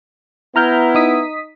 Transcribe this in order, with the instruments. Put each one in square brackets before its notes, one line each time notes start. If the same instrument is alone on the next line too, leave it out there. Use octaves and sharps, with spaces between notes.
[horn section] B3 E4 [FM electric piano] A#5 F6 G6
[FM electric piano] D#4 D#6 B6